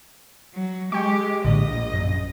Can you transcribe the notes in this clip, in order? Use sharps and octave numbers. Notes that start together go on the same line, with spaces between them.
F#3
G#3 G4 G5 C#6
A#1 A2 D3 D#5
F#2